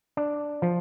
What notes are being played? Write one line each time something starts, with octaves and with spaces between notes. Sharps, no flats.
D4
F3